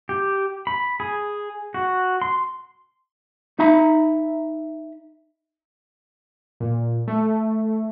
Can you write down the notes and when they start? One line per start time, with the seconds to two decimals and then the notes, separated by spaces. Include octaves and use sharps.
0.09 G4
0.67 B5
1.00 G#4
1.74 F#4
2.22 C6
3.59 D#4 E5 A#5 B5
6.60 A#2
7.07 A3